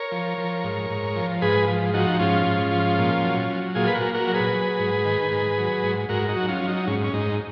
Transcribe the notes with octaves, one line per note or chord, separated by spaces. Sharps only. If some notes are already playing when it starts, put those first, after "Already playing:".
Already playing: A#4 C#5
F3
F3
G#2
G#2
F3
G#2 G#4 B4
F3
F3 D#4 F#4
G#2 C#4 F4
G#2
F3
A#2
F#3
F#3
A#2 F4 G#4
B4
F#4 A#4
A#2
F#4 A#4
F#3
G#4 B4
F#3
G#2
D#3
G#2
F#3
G#2
G#2 F#4 A#4
D#4 F#4
F#3
C#4 F4
F#3
D#4
G#2 C#4
C#4
G#2 D#4